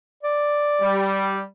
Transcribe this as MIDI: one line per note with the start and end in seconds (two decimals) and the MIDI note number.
0.24 1.12 74
0.80 1.41 55